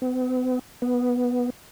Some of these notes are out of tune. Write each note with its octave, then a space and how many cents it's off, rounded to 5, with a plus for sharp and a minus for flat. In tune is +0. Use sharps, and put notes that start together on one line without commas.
B3 +45
B3 -5